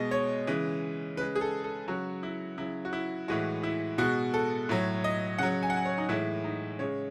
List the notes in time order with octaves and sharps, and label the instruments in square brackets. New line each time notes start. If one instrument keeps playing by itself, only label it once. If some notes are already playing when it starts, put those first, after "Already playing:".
Already playing: [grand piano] B2 G#3 D#5
C#5
C#3 E3 G#3
C#3 B4
G#3
G#4
A4
A4
C#3 F#3 F#4
E4
C#3 F#3 E4
F#4
E4
A2 E3 G#3 F#4
E4
B2 G#3 F#4
A4
A2 F#3
D#5
C#3 F#3 F#5
G#5
F#5
G#5
C#5
D#4
A2 E3 G#3 E4
D#4
C#3 G#3 C#5